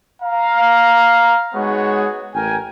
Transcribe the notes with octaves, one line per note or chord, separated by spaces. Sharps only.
F5 A#5
G#3 B3 D#4 F#4 G#4 C#5
A1 A#4 G5 G#5